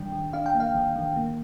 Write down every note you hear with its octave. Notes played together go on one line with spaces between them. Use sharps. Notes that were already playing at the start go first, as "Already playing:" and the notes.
Already playing: D#3 G3 D4 G5
D#3
D4 F5
G5
A#3
F5
D#3
D#3
A#3